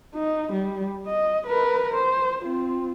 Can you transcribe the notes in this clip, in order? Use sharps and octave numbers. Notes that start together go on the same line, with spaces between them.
D#4
G3
D#5
A#4 B4
C5
C4 F4